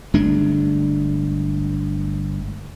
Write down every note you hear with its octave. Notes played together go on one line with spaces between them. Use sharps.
G1 G#3 A3 D4